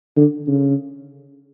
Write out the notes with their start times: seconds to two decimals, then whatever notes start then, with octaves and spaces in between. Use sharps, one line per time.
0.17 D3
0.47 C#3